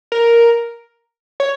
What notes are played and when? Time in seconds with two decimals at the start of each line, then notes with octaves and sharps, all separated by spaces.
0.12 A#4
1.40 C#5